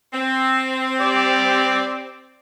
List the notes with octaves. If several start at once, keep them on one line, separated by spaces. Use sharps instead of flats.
C4
G4 D5